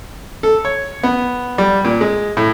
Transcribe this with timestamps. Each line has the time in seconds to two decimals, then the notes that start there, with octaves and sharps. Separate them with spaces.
0.43 A4
0.65 C#5
1.03 B3
1.58 G3
1.85 A#2
2.01 G#3
2.37 A2